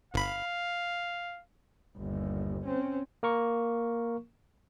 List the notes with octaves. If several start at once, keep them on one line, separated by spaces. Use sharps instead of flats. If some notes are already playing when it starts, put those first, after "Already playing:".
G1 F5 B5
G1 D#2
C4 C#4
A#3 A#4 C#6